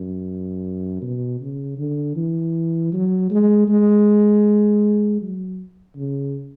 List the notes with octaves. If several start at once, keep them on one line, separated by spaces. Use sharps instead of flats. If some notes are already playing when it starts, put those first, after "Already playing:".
Already playing: F#2
B2
C#3
D3
E3
F#3
G#3
G#3
F#3
C#3